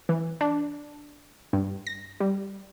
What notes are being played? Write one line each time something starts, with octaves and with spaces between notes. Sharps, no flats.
E3
D4
G2
A#6
G3